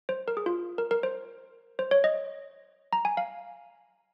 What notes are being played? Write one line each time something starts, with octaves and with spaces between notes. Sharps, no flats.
C5
A#4
G#4
F4
A#4
A#4
C5
C5
C#5
D#5
A#5
G#5
F5